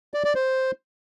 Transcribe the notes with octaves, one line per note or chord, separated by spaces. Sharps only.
D5
D5
C5